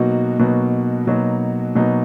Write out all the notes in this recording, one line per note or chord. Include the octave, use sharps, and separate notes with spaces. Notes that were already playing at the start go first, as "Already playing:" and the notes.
Already playing: B2 F#3 A#3 D#4 F#4
B2 F#3 A#3 D#4 F#4
B2 F#3 A#3 D#4 F#4
B2 F#3 A#3 D#4 F#4